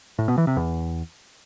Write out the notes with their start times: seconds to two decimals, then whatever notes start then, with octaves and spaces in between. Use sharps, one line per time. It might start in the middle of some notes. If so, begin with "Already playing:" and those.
0.19 A2
0.28 B2
0.38 E3
0.47 C3
0.57 E2